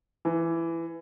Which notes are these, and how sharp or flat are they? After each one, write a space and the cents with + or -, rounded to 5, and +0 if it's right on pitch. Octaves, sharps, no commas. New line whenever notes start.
E3 +15